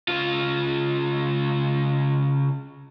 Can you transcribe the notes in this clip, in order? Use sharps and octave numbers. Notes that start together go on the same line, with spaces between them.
C#3 F4